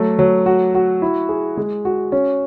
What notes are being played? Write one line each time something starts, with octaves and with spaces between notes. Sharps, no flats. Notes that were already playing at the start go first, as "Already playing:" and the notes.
Already playing: F#3 A3
F#3
F#4
F#4
E4
G#4
G#3
F#4
C#4